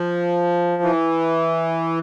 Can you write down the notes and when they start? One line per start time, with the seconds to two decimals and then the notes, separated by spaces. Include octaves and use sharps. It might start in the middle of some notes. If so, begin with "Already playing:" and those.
Already playing: F3
0.83 E3